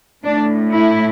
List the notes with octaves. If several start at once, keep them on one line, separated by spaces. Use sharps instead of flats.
A2 A3 D4
E4